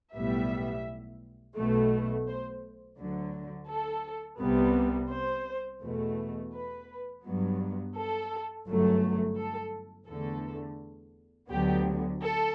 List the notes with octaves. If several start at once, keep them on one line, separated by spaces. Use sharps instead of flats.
B1 A2 G3 B3 E5
B1 B2 A3
C5
D2 D3 F#3
A4
C2 C3 G3 B3
C5
E2 B2 A3
B4
G2 F#3 B3
A4
G1 F#2 F#3 A3
A4
E2 D3 A3 A4
D2 D3 F#3 B3 G4
A4